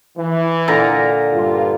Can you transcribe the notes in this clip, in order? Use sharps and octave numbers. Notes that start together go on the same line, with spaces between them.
E3
A#2 D3 A#5
G2 F4